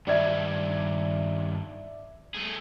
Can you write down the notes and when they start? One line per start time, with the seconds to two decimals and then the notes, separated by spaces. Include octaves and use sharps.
0.07 G2 D#3 D5 E5 G#6
2.35 A3 G#4